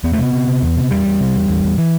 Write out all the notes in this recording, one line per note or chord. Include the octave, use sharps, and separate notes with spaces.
E2 B3
A3
C3 B3
C3
C3
E2
C3
E2 G3
E2
C3
E2
E2
E2
E3